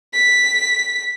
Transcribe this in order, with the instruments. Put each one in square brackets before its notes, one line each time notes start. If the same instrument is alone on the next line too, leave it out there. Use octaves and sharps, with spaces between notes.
[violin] B6